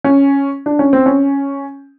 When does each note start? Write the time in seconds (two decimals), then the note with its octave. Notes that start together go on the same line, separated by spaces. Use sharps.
0.04 C#4
0.66 D4
0.79 C#4
0.93 C4
1.06 C#4